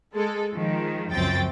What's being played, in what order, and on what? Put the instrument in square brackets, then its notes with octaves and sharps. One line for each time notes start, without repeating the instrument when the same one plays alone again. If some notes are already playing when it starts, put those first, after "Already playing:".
[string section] G#3 A4
D#3 F3 G#3
C#2 F#2 F3 C4 G5 A6